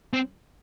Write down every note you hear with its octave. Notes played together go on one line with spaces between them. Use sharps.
C4